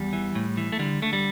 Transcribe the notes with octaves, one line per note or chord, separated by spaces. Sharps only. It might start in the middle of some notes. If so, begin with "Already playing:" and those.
Already playing: E2 G3
E3
A2
E3
A3
D3 G3
D3 A3
G3